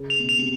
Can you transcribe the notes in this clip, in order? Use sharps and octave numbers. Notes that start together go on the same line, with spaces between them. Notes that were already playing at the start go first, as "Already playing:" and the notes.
Already playing: C#3
F7
B2
F7
C3